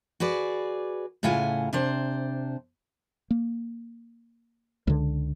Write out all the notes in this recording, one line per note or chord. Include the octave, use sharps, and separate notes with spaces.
F#4 G#4 B4 D5
A2 C#3 E4 F4 F#5 G#5
C3 D4 C5
A#3
C#2 D3